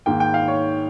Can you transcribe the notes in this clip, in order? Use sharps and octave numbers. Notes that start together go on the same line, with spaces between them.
G#2 D#3 A#3 G5
G5
F5
C#5